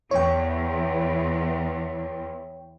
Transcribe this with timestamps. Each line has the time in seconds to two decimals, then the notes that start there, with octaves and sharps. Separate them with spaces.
0.11 E2 C#5 G5